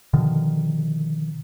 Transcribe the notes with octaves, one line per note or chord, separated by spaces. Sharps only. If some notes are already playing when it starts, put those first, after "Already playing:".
B2 D3 D#3 F3